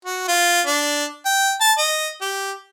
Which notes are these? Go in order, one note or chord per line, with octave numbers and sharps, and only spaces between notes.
F#4
F4
D4
G5
A5
D#5
G4